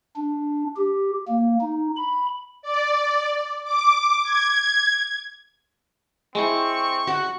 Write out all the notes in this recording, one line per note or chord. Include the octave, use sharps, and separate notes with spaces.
D4
G4
A#3
D#4
B5
D5
D6
G#6
G#3 C4 E4 C#6
F#4 F#5